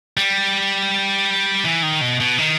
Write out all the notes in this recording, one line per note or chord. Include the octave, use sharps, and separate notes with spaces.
G3
E3
D#3
B2
B2
D#3